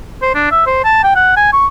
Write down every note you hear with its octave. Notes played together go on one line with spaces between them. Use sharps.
C5
D4
E5
C5
A5
G5
F#5
G#5
C#6